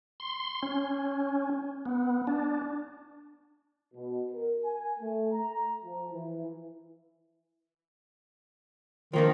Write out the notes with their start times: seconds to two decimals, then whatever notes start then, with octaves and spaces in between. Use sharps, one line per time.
0.20 C6
0.63 C#4
1.86 B3
2.27 D4
3.94 B2
4.32 A#4
4.64 G#5
4.99 A3
5.32 A#5
5.83 F3
6.12 E3
9.13 D#3 F3 A#3 D4